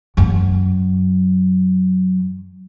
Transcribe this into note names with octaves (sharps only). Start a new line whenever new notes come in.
F#2 F#3